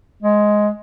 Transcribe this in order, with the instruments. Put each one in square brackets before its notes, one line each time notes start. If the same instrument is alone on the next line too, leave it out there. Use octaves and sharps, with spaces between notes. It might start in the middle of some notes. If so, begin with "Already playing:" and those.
[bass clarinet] G#3